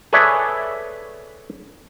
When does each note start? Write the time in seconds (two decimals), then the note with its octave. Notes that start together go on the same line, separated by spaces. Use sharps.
0.13 G#4 A4 B4 C#5 D5 E5